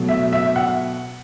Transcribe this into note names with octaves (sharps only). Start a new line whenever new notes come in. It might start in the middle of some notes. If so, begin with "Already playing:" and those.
Already playing: B2 F#3 A3
E5
E5
F#5